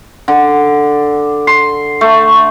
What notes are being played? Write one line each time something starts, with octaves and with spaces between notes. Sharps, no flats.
D3
C6
A3